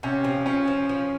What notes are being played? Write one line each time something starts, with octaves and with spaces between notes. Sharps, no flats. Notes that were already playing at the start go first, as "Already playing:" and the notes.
C3 C#4
F3
F3 C#4
F3
F3